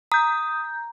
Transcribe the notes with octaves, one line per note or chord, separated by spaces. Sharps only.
A#5 D#6 G6